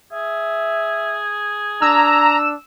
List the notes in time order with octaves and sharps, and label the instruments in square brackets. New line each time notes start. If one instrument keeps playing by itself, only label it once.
[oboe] G#4 [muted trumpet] E5
[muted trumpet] D4 [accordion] A#5 [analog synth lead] E6